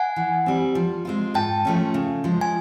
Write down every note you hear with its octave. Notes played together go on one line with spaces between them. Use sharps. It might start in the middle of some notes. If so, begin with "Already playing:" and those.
Already playing: F#5 G#5
E3
G3 C4
F3
G#3 C4 F4
G#2 G5 A5
F3 A3 C#4
C#3
F3 G#3
G#5